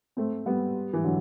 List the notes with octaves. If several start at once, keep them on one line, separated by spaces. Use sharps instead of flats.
A3 C4
G3 B3
E3
D3 F#3